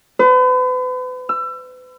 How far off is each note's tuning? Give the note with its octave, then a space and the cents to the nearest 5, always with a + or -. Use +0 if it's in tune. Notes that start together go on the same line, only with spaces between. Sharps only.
B4 +40
E6 +30